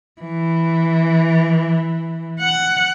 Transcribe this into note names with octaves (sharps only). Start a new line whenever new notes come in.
E3
F#5